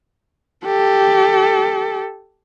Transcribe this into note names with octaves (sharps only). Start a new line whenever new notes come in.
G4 A4